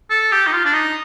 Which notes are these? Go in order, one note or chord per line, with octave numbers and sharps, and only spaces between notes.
A4
G4
D#4
F4
D4
D#4